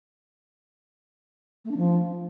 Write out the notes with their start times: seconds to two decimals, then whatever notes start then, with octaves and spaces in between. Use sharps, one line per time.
1.64 A3
1.70 D4
1.76 F3